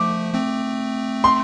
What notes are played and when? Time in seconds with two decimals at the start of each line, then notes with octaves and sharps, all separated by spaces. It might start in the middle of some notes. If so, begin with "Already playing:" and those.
Already playing: F3 A3 D6
0.34 A3 C4
1.24 C6